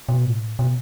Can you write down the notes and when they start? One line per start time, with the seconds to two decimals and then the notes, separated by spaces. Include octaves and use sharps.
0.09 B2
0.25 A2
0.59 B2